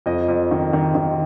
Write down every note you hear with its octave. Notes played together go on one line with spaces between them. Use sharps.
F2 D#5
F2
D#3
D#3
D#3